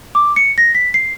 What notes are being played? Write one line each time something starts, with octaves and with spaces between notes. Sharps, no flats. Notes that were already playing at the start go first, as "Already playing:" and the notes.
D6
C#7
A#6
B6
C7